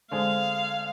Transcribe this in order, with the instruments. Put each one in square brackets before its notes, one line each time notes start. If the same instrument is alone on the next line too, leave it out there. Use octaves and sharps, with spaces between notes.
[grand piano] D3 G#3 C4 [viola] F5